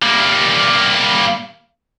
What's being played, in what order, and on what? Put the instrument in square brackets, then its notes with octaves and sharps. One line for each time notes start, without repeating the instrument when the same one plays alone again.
[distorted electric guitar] G3 A#3